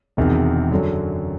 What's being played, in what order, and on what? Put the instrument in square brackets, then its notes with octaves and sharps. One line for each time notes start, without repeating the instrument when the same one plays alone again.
[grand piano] E1 E2 C3 D#3
F#2 D3 F#3